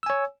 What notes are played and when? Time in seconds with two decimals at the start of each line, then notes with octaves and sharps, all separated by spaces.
0.03 E6
0.06 G#5
0.10 C#5